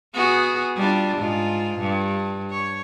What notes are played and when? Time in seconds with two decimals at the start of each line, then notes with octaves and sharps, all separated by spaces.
0.14 B3 F#4 G#4
0.77 G3 D4 F4
1.17 G#2 F4
1.80 G2
2.51 C#5